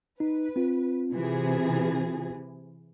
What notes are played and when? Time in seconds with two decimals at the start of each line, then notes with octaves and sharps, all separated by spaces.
0.20 D#4 B4
0.56 C4 F4
1.13 C3 E3 G#4